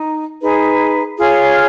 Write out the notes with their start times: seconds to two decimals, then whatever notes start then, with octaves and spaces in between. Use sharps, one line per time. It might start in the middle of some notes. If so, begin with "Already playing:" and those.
Already playing: D#4
0.41 D#4 G#4 B4
1.18 F4 G#4 C#5